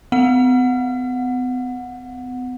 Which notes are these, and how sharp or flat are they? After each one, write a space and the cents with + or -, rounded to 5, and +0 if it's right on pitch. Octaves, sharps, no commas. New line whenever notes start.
B3 +45 F#5 -15